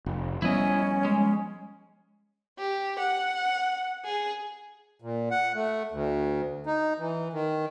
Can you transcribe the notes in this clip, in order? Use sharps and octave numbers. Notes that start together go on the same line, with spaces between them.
F1
F3 G3 B3 C#4 E4 D#5
G#3
G4
F#5
G#4
A#2
F#5
A3
D2
D#4
E3
D#3